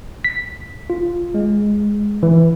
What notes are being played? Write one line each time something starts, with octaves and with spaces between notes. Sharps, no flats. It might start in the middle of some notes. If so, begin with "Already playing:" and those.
B6
F4
G#3
E3